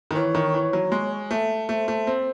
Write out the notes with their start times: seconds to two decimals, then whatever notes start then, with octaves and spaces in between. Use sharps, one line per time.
0.11 D#3
0.15 E3 C#5
0.35 D#3
0.54 E3
0.73 F#3
0.92 G#3
1.31 A3
1.69 A3 C5
1.88 A3
2.07 C4